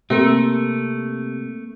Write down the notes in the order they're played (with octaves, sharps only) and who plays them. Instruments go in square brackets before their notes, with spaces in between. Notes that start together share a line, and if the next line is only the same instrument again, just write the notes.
[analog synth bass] C3 [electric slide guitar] A3 [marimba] A#3 C4 A#4